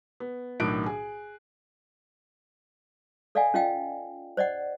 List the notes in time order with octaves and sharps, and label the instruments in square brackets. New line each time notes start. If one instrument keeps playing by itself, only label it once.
[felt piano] B3
B1 A2 D#3 D4 F#6 D7
G#4
[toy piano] A4 D5 D#5 F5 F#5 G#5
C#4 F4 D#5 F5 G5
C5 D5 D#5 F#5